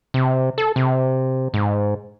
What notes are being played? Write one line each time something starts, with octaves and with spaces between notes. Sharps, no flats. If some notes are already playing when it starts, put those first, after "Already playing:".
C3
A4
C3
G#2